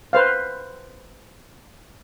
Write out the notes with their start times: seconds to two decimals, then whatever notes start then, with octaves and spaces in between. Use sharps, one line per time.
0.13 B4 C5 F5